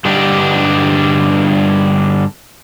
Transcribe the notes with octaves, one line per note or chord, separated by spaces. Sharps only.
G2 D3 G3 D4 D#4 G4